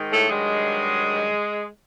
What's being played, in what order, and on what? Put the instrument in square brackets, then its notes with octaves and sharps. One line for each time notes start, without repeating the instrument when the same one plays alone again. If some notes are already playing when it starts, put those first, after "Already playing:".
Already playing: [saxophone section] G#2 D#3
A2 A3
G2 D#3 F#3 G#3